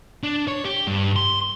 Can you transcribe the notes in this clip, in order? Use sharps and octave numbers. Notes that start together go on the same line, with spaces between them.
D4
C#5
G4
G2
C6